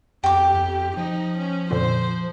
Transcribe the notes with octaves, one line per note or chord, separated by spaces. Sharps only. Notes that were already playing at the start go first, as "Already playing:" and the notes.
F2 G4 G5 D6
F2
F3 D#4
C#4
F2 A#2 D3 C5